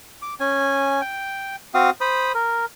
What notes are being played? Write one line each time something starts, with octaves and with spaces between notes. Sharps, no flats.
D6
C#4 G#5
G5
C4 F#4 F5 D#6
C5 B5 D#6
A#4